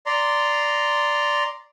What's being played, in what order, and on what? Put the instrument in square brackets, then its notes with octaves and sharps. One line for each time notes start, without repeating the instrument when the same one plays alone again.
[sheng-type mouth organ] D5 A#5 C6